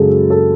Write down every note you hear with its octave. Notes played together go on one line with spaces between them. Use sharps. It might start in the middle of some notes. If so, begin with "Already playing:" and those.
Already playing: F#1 F#2 C#3 G#3 G#4 A4
A4